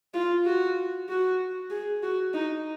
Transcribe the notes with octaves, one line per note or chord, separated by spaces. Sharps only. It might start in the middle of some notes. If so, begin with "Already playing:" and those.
F4
F#4
F#4
G#4
F#4
D#4